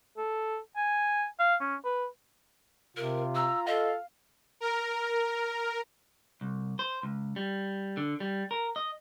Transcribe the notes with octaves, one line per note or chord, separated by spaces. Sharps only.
A4
G#5
F5
C#4
B4
C3 F4 A#4
A#5 E6
A4 D#5 F5
A#4
C2
C5
C#2
G3
D3
G3
A#4
D#5